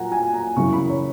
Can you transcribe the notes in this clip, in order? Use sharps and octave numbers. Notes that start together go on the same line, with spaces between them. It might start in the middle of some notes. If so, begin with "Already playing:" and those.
Already playing: A#2 F#3 F#5 G#5 A#5
G#5
A#5
F#2 C#3 E3 C#6
B5
C#5